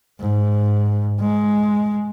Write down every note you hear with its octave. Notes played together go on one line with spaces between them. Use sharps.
G#2
G#3